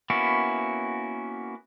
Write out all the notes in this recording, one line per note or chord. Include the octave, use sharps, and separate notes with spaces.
A#3 B3 C#4 E4 F#4